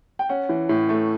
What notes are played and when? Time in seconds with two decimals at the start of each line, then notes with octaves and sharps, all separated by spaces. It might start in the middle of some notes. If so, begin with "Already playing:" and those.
0.19 G5
0.29 C#4 F#5
0.49 E3
0.69 A2
0.89 A3